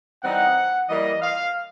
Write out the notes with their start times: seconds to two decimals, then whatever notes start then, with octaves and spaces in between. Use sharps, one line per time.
0.23 E3 G3 C4 D#4 F#5
0.89 E3 G3 A#3 D#5
1.22 F5